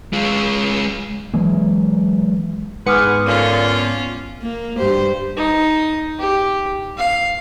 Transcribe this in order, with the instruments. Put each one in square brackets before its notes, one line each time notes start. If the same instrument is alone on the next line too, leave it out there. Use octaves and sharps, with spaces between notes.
[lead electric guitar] G#3 F4
[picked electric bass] E3 F#3 G#3 A#3
[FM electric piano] G#2 B3 C#7 [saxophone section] G#4 B4 [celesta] C6 D6 F6
[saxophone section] A#2 D3 [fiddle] C#4 F4
[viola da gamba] A#3
G2 G4 C5
[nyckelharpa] D#4
G4
F5